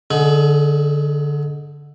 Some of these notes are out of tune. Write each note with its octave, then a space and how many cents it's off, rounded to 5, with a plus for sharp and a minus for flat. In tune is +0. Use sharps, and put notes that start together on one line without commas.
D3 +0 D#4 +0 G#4 +35